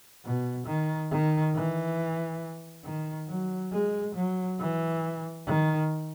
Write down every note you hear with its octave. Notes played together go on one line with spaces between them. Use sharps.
B2
D#3
D#3
E3
D#3
F#3
G#3
F#3
E3
D#3